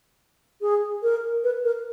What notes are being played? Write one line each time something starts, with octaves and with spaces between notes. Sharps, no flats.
G#4
A#4
B4
A#4